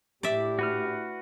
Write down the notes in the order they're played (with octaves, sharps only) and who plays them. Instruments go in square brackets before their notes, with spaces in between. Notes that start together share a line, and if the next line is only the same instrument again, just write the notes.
[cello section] A2 D4 E4 [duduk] G4 [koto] D5 E5
[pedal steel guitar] F#4 B4 F6